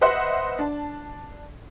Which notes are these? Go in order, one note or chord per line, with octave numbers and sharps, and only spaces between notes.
B4 C5 D#5 E5 F#5 C6
D4 A5